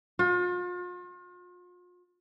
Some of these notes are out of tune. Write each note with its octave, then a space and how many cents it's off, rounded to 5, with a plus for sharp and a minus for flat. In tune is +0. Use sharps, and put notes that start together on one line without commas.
F4 +40